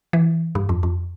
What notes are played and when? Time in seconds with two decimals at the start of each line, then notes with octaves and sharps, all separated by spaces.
0.13 E3
0.55 G2
0.69 F2
0.83 F2